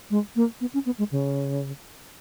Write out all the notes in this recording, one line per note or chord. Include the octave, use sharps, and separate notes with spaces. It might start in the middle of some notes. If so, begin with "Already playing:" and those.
G#3
A#3
B3
C#4
B3
G#3
C#3